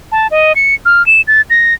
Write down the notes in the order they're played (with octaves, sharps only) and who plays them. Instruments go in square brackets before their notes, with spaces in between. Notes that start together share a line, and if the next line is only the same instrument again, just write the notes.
[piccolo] A5
D#5
C#7
F6
E7
A6
A#6